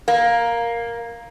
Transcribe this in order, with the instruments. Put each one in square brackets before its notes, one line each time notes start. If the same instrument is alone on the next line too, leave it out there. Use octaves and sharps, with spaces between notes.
[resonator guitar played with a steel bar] A#3